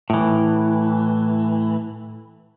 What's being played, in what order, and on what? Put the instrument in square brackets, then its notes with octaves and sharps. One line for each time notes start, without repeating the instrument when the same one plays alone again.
[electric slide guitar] A2 E3